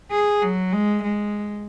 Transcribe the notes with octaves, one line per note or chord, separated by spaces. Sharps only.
G#4
F#3
G#3
G#3